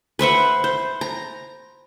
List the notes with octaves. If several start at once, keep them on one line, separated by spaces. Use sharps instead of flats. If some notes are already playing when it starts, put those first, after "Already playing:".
B4 C5 E5 F#5
C5
A#5